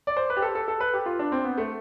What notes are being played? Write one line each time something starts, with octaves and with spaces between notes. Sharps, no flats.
D5
C5
B4
G4
A4
A4
A4
B4
G4
F4
D4
C4
B3
A3